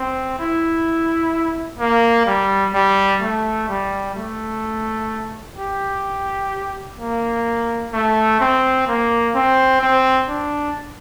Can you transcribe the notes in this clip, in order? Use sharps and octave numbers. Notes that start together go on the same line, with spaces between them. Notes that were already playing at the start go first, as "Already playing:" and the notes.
Already playing: C4
E4
A#3
G3
G3
A3
G3
A3
G4
A#3
A3
C4
A#3
C4
C4
D4